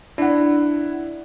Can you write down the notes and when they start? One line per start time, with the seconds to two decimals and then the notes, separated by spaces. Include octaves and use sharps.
0.18 D4 E4 F#5